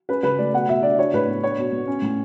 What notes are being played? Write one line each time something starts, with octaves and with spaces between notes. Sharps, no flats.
C#4 B4
C#3 B4
A3 D5
B2 F#5
B2 E5
D4 D5
D4 C#5
A2 B4
B3
D4 C#5
B2
B3
C#4
A2